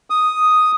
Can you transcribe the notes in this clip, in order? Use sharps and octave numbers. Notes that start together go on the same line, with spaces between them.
D#6